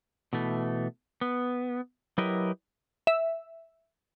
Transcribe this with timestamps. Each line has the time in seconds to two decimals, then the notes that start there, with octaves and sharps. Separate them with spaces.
0.33 B2 E3 A3
1.21 B3
2.18 F#3 E4 G4 A#4 B4 D#5
3.07 E5